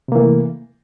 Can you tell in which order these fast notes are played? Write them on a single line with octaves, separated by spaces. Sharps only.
C3 A#3 E3 A3